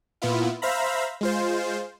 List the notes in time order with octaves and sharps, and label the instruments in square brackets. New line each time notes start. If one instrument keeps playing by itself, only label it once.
[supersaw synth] A#2 B3 E4 F4
C5 E5 F5 A#5 B5
G#3 F4 C5